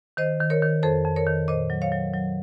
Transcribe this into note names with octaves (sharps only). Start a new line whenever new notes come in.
D#3 C5 D#5
D#3
A#4 C#5
D#3
F2 A4 C5
F2
A#4 C#5
D#3
A#2 C5 D#5
F#3
C#5 F5
F#3
F#3